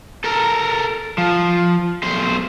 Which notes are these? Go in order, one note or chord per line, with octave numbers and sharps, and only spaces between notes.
A4 A#4
F3
B1 C5